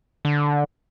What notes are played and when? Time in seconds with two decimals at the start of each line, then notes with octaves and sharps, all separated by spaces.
0.25 D3